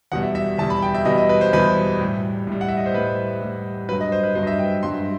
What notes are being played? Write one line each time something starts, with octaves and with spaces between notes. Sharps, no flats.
E2 B2 G3 F#5
E5
E5
E2 B2 G3 A5
B5
G5
E5
E2 B2 G3 D#5
D#5
B4
C5
E2 B2 G3 B4
A2 G3
A2 G3
F#5
E5
D#5
C5
A2 G3 B4
A2 G3
G2 F#3 B4
D#5
C5
B4
G2 F#3 C5
D#5
E5
G5
G2 F#3 C6